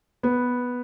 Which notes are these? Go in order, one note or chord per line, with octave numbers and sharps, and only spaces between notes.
B3